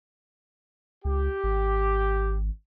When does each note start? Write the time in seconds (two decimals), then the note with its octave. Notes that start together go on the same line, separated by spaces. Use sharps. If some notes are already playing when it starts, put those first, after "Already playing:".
1.05 C#2 G4
1.44 G#1